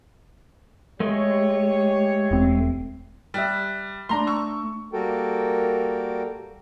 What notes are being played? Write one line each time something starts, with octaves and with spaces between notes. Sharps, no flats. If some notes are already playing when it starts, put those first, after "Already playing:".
G#3 A3 G4 C#5
E1 C4
G3 E5 F#6
A3 D4 A#5 C6
C#6 E6
G3 A#3 F#4 A4 A#4 G5